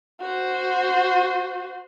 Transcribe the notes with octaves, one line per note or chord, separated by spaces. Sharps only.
F#4 C5